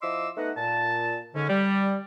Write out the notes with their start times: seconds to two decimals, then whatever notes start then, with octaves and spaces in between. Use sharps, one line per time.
0.02 F3 E4 D#5 C6 D6 E6
0.37 A3 B3 D#4 D#5 F#5
0.56 A#2 A5
1.34 G#2 D3 C#4
1.49 G3